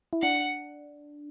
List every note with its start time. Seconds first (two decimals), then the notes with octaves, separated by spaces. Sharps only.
0.13 E4
0.22 D4 F#5